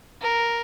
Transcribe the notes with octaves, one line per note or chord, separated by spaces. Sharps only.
A#4